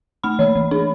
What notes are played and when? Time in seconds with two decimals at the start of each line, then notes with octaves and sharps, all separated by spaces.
0.24 A3 B5
0.39 E3
0.55 E3
0.71 D4